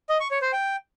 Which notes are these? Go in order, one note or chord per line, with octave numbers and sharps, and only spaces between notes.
D#5
C#6
C#5
C5
G5